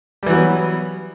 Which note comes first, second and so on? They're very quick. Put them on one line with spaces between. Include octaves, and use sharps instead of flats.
G3 E3 F#3 B3